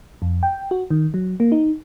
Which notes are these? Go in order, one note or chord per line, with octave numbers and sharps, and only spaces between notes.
F2
G5
F#4
D#3
F#3
A#3
D#4